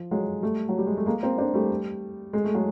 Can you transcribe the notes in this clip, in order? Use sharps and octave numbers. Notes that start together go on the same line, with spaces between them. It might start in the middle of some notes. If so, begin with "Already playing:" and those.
Already playing: F3
F#3 G#3
G3 A3
F#3
G3
G#3
A3
G#3 A#3
A#3 C4
C4 D4
G3 A3
G#3
A3
F#3 G#3